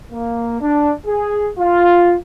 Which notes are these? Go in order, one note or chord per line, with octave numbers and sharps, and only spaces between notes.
A#3
D4
G#4
F4